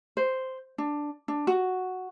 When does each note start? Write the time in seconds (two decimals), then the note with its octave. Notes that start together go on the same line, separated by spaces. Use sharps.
0.17 C5
0.78 D4
1.28 D4
1.47 F#4